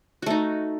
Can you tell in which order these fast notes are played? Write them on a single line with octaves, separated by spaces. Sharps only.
F#4 A3 D#4